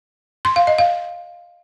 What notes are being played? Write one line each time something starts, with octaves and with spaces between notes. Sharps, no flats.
C6
F5
D#5
F5